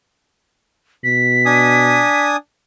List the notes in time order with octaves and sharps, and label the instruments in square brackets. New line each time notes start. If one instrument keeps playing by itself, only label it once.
[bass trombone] B2 [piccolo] B6
[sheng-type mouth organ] D4 G#5 D#6